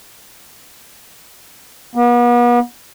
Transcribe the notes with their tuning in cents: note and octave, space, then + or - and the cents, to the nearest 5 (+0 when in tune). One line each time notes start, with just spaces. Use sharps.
B3 -40